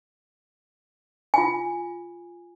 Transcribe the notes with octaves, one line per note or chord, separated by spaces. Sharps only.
F4 G#5